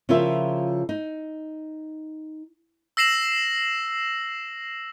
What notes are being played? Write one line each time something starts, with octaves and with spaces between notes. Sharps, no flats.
C#3 F3 E4 F4 A#4 E5
D#4
E6 A#6 C7 E7 F#7